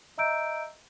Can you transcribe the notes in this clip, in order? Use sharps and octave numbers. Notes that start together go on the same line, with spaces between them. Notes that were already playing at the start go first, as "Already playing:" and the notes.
D#5 E5 A#5 E6 G6 D7